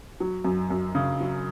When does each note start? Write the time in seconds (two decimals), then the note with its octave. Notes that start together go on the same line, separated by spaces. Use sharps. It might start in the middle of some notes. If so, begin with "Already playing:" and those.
0.20 F#3
0.45 F#2
0.70 F#2
0.95 C#3
1.20 F#3